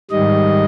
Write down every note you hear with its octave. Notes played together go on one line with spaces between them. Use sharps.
G#2 D#3 G3 D#5